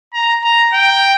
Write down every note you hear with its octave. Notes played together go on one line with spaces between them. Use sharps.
A#5
A#5
G5